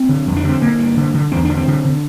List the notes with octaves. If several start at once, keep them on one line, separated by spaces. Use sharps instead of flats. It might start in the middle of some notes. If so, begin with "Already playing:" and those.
Already playing: C4
D3
F2
D4
D3 C4
D3 A#3
G2
D3
D3
E2 C4
D3 D4
C4
D3
D3